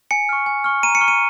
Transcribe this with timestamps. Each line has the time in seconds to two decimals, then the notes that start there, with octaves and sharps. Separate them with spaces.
0.11 G#5 C#7
0.29 C#6 F6
0.46 G#5
0.64 C#6 F6
0.83 A#5 D#7
0.95 C#7
1.01 C#6 F6
1.08 D#7